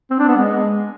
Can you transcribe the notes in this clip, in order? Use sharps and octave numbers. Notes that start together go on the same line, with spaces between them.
C4
D4
B3
G#3